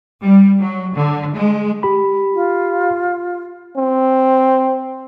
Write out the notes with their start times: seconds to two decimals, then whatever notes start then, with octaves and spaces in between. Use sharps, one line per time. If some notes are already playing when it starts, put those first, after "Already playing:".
0.23 G3
0.60 F#3
0.96 D3
1.35 G#3
1.83 G4 B5
2.34 F4
3.78 C4